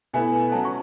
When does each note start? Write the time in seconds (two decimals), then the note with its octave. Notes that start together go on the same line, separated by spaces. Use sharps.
0.14 B2 A3 E4 B4 G#5
0.52 F#3 C#4 F#4 A5
0.65 C#6